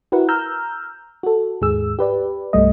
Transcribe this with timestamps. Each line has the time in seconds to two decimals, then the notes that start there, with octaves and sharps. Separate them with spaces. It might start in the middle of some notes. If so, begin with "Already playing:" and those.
0.12 E4 F#4 A#4 B4 F#5
0.29 A#5 E6 F6 G6
1.23 F#4 A4
1.61 D#2 G#2 G#4 E6
1.99 G4 B4 D5
2.53 C2 G2 G3 A3 D#5